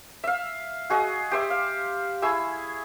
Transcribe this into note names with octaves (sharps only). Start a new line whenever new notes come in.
E5 F5
F#4 G#4 D#5
G4 C5 E5
F5
E4 G#4 C#6 E6